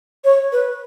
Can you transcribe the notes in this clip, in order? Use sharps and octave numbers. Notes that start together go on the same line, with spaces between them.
C#5
B4